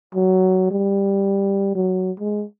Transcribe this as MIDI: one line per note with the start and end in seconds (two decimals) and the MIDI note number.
0.15 0.71 54
0.71 1.74 55
1.75 2.11 54
2.19 2.44 56